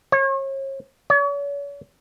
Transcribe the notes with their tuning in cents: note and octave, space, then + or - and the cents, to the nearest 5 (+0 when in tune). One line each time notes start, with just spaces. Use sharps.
C#5 -40
C#5 +40